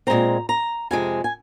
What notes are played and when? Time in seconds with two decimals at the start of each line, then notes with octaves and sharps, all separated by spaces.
0.07 A#2 G#3 C4 A#5
0.49 A#5
0.91 F2 C3 G#3 G#5
1.24 G#5